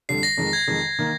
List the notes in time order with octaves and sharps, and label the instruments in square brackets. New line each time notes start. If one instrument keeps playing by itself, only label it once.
[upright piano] F2 D3 G3 D4 [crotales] C7
[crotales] A#6
[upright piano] F2 D#3 G#3
[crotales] G#6
[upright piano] F2 D#3 G#3
D#3 A#3